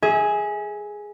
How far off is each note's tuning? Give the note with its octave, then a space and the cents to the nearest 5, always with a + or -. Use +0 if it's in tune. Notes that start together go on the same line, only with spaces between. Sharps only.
G#4 +0 E5 -35